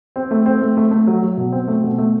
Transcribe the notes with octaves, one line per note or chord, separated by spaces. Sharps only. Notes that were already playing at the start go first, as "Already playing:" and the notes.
C4
A3
C4
A3
A3
A3
F#3
F#3
B2
C4
A3
B2
A3